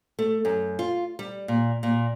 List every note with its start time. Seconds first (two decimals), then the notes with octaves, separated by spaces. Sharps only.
0.19 A3
0.45 F#2
0.79 F4
1.19 G3
1.48 A#2
1.83 A#2